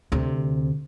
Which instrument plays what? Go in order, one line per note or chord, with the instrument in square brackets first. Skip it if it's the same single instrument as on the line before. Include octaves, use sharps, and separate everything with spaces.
[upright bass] D2 C3